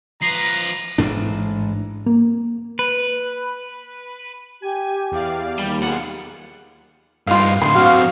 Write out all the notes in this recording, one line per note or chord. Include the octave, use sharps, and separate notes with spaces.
F3 B4 A#5 C7
A1 G#2 D4
A#3
B4
G4 G#5
E2 D5 F5
D#2 G3
B1 F4 G#4 F#5
G2 D#4 F4 F5
A2 D3 C6
F#3 C4 F#4 F5